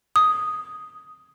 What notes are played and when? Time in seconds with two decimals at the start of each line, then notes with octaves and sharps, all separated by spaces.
0.16 D#6